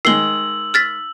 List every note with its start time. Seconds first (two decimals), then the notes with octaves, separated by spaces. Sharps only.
0.05 D#3 G#3 E6 C7 F#7 G7
0.74 F6 A6 B6